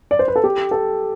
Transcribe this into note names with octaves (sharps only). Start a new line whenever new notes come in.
D5
C5
B4
A4
G4
A4